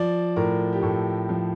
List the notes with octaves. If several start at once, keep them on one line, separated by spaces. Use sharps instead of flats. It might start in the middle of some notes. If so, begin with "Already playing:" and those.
Already playing: F3 D5
A2 A#4
G4
A2 A4
F3